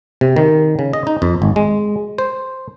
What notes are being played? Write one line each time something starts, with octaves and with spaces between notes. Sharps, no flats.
C3
D#3
C#3
D#5
D#4
F2
G#1
G#3
C5